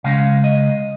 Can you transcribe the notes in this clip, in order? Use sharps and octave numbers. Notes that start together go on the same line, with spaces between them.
C#3 G#3 C#4 F5
D#5